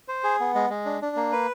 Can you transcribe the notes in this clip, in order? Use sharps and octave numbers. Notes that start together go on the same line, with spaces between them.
C5
G#4
B3
G#3
G#3
D4
D4
A#3
B4